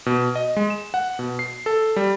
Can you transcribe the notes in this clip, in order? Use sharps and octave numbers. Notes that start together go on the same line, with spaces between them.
B2
D#5
G#3
E7
F#5
B2
C7
A4
G3